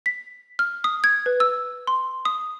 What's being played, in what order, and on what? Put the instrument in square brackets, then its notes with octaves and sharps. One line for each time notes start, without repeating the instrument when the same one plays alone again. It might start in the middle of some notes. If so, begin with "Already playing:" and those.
[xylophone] B6
F6
D#6
G#6
B4
E6
C6
D#6